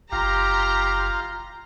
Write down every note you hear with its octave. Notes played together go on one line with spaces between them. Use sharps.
F#1 F4 G4 F5 A#5 C6